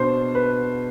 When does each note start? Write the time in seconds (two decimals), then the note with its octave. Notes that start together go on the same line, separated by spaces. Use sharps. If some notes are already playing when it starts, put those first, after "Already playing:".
Already playing: B2 B3 D4 C5
0.35 B4